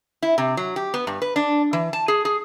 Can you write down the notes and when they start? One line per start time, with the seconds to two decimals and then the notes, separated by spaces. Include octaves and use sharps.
0.22 E4
0.38 C3
0.57 F#3
0.76 G4
0.94 B3
1.07 G2
1.22 B4
1.36 D4
1.73 E3
1.93 A5
2.08 G#4
2.25 G#4